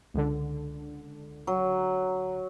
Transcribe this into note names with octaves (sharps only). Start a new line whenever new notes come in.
C#2 D3
F#3